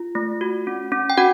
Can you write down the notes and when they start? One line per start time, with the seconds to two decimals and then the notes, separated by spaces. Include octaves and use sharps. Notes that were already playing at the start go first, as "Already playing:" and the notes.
Already playing: F4
0.15 A3
0.41 F#4
0.67 C#4
0.92 C#4
1.10 G5
1.17 C#4 F#4 F#5